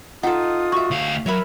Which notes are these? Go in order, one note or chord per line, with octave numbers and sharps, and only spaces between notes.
D#4 F4 A4 F#5 G5 D#6
F#4 E5 C#6
D2 F5
F#3 A#4 C#5 E5 B5